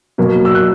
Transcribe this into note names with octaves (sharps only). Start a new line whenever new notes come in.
B2 F#3 A#3
E6
F#6